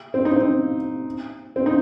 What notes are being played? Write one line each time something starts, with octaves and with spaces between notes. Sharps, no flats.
C4
D#4
C4
C4
D#4